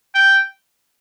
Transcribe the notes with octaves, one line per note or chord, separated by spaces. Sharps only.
G5